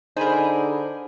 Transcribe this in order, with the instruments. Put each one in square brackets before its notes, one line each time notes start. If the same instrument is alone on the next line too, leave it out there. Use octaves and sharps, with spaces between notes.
[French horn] D3 [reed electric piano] D#4 [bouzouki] G#4 A#4 [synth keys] C5 G#5 B5